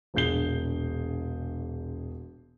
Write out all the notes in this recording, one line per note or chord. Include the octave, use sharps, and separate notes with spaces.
E1 A#1 G#4 G6 C7 G7